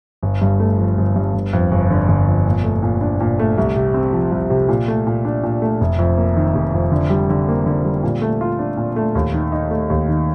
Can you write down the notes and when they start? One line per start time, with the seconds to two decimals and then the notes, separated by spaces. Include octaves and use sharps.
0.23 G1
0.41 G2
0.60 A3
0.78 F3
0.98 G1
1.16 G2
1.34 G1
1.53 F2
1.72 G1
1.90 D3
2.08 G1
2.27 F2
2.46 A#2
2.64 A3
2.83 A#2
3.01 D4
3.20 A#2
3.39 A3
3.58 C2
3.76 C3
3.94 C4
4.13 F3
4.32 C2
4.50 C3
4.69 A#2
4.88 A3
5.07 A#2
5.25 D4
5.43 A#2
5.62 A3
5.81 F1
5.99 F2
6.18 A#3
6.37 D#3
6.55 F1
6.74 F2
6.92 D3
7.10 G3
7.30 D3
7.48 A#3
7.66 D3
7.85 G3
8.03 A#2
8.22 A3
8.41 F4
8.59 D4
8.77 A#2
8.96 A3
9.15 D#2
9.34 D#3
9.52 D#4
9.71 A3
9.90 D#2
10.08 D#3